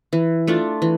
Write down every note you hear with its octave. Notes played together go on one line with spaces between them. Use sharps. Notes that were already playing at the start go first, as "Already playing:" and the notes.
E3
A3 D4 F4
E3